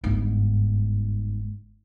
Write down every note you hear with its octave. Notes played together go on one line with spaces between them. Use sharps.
G1 G#2